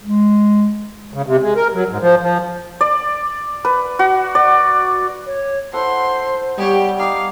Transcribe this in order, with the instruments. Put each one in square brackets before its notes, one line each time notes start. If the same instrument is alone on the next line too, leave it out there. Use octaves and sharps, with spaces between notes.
[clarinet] G#3
[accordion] C#3
C3
G#3
A#4
F#3
G#2
F3
F3
[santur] D5
B4
F#4
D5
[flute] C#5
[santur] E4 A4 F#5 [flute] C5 [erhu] C6
[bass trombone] G3 [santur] B3 C#5 G5 [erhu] G4
[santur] D#4 [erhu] F5 [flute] D6